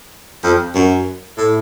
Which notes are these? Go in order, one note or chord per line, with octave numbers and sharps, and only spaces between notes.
F2
F#2
A2